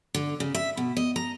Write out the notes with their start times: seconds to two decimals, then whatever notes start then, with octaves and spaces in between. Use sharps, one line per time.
0.14 D3
0.40 C#3
0.55 E5
0.77 B2
0.97 D#5
1.16 A#5